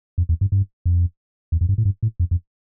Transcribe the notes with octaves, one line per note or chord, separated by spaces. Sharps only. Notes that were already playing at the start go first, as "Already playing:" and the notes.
F2
E2
G2
G2
F2
E2
F2
G2
A2
G2
A2
F2
F2